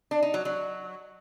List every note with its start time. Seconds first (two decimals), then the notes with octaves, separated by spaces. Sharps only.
0.11 D4
0.22 D#4
0.34 F#3
0.45 F#3